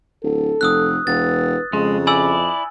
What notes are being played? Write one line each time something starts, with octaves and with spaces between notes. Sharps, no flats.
D1 A4
F1 D#6 E6 F#6
E1 B4 A6
F2 C#3 G#3
E4 D5 G#5 E6